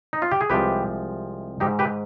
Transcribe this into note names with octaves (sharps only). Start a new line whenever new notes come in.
D#4
F4
G4
G#4
C2 C3 F3 G#3 G4 B4
G#2 D#3 G#3 D#4 G4
G4 B4